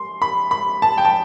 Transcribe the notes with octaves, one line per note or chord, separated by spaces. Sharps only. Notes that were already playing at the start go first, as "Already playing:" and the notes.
Already playing: C6
B5
B5
A5
G5
A5